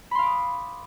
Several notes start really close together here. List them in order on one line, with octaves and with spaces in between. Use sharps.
B5 C6 F5 D6 D#6